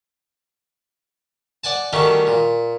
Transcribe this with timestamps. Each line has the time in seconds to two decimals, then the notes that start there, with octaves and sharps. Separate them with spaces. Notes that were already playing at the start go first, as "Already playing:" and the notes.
1.64 D5 F#5 G#5 A5
1.93 D#3 F#3 G3 A3 C#4
2.27 A#2